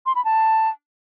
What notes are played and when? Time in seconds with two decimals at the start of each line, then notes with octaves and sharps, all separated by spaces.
0.06 C6
0.15 B5
0.25 A5